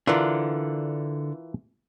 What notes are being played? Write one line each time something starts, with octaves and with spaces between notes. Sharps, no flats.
D3 E3 D4 F4 A#4